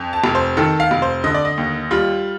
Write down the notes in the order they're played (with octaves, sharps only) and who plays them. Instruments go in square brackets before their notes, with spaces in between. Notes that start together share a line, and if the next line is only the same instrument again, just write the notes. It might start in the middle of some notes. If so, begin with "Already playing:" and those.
Already playing: [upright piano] F2
A5
F1
C5
D#3 A4
F5
F1
C5
D3 D#5
D5
D#5
D#2
G3 F4